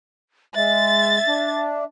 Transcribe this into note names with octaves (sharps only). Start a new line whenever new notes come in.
G#3 E5 A6
D4